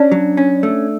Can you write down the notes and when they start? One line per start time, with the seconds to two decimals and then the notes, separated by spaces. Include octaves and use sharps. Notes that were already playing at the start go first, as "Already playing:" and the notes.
Already playing: C#4 D4
0.12 F#3
0.37 C#4
0.63 A3